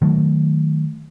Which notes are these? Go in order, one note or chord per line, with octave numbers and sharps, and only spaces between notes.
D#3 F#3 A3